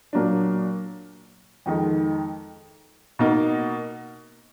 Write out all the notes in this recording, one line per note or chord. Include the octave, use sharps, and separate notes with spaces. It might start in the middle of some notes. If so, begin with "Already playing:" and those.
A#2 F#3 A#3 D4
F2 D#3 G#3 D#4
B2 A#3 D#4